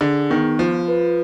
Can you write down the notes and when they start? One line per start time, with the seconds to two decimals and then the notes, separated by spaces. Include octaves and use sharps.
0.01 D3 G#4
0.30 D#3 B3
0.59 F3 F4
0.88 B4